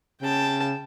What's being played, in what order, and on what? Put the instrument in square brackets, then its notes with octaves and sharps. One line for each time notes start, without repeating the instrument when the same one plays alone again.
[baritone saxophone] C#3 [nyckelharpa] G5 A5